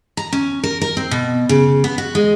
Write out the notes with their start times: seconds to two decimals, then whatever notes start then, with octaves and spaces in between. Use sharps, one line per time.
0.17 A#5
0.33 C#4
0.64 A#4
0.82 A#4
0.97 C4
1.11 B2
1.49 C#3
1.84 B3
1.98 F#4
2.15 G#3